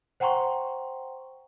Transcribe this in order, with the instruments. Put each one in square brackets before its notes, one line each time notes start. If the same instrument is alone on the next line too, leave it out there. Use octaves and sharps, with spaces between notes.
[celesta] C5 F#5 G5 A#5 C6 C#6